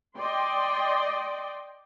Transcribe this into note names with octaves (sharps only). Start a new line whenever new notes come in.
D5 D#5 G5 C6